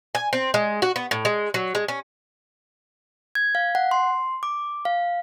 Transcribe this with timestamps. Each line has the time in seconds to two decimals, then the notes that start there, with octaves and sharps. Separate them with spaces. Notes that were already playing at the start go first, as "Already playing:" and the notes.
0.15 G#5
0.33 C4
0.54 G#3
0.82 F#4
0.96 B3
1.11 A2
1.25 G#3
1.54 F#3
1.75 G#3
1.88 C#4
3.35 G#6
3.55 F5
3.75 F#5
3.91 C6
4.43 D6
4.85 F5